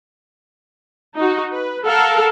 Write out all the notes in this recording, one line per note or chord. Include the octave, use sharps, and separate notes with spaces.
D#4 F#4
B4
A4 A#4 F5 F#5